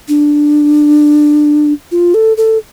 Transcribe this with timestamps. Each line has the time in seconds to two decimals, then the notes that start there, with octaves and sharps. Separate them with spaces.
0.08 D4
1.91 F4
2.14 A4
2.37 A4